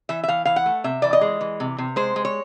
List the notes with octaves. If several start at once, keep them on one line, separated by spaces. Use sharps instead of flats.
E3 E5
E5
E3 F5
E3 F5
F#5
A3
C3 E5
E3 D5
D#5
G#3
E3
C3
C3
G#3 C5
G#3
C#5